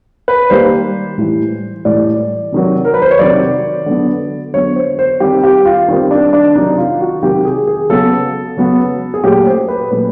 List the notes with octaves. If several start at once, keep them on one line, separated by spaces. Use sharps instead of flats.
B4
D#3 G3 A#3 C5
A2 E3 G3
A2 E3 G3 D5
C3 D#3 F#3
A#4
B4
C5
C#5
C3 D#3 F#3 D5
D3 F#3 B3
D3 F#3 B3 C#5
C5
C5
D#3 G3 C4 G4
G4
F4
D#3 G3 C4
D4
D4
C3 D#3 F#3 D#4
F4
F#4
C3 D#3 F#3 G4
G#4
G#4
C#3 F#3 B3 A4
C#3 F#3 B3
G#4
A#2 F#3 A3 C#4 G4
C5
B4
A#2 F#3 A3 C#4 B4